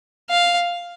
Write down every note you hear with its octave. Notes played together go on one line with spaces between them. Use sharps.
F5